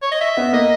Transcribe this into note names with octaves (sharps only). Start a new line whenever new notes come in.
C#5
D#5
E5
B3
A#3 D#5